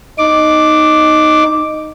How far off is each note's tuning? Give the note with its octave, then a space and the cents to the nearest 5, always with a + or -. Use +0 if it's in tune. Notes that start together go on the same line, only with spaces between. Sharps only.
D#4 -5 D6 +0